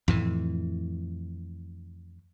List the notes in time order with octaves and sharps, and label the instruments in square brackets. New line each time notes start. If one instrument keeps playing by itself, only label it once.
[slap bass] F2 A2 E3